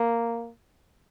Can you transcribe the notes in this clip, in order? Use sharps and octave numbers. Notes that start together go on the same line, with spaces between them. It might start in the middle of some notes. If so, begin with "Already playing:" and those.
Already playing: A#3